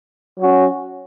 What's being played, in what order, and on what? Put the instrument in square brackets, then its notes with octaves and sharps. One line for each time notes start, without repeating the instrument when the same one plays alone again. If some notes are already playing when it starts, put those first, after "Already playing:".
[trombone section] F#3 C#4 F#4